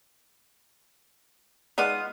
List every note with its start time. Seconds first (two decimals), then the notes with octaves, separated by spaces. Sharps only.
1.78 G#3 B3 D#4 F4 D5 D#6